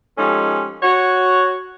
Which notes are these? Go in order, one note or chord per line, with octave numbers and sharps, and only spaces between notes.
F3 G#3 A3 C#4 D#4 G4
F#4 C#5